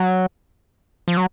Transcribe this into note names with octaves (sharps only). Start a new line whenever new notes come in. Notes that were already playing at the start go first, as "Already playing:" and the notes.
Already playing: F#3
F3
F#3